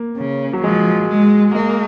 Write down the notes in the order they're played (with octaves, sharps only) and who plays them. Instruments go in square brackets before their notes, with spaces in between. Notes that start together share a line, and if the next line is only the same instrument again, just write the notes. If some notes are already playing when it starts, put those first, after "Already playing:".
Already playing: [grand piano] A#3
[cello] C#3
[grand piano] F#3
[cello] F3 [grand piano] G#3
[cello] G#3
[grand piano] G#3 [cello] A#3